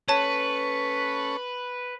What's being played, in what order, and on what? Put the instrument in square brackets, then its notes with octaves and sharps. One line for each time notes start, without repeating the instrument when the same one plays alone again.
[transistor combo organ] C#4 A4 C#6 [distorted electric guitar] B4 [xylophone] C#5 A5